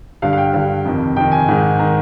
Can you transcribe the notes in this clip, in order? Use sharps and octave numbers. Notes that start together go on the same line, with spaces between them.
G2 D3 F5
F5
G5
G2 D3
F2 C3 D#3
F2 C3 D#3 G5
G#5
G#2 D#3
D#3 A#5